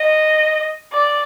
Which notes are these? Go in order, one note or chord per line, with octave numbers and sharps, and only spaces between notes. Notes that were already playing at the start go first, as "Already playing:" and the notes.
Already playing: D#5
D5